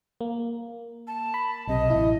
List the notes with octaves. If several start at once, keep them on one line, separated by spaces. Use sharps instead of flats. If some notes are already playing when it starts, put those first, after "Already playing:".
A#3
A5
B5
B1 C3 D#5
A1 E4